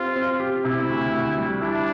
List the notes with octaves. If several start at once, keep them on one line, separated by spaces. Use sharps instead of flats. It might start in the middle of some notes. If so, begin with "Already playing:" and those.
Already playing: C4 F4 G4
C4
G4
C3 E4
D2
D2
G3
D4 E4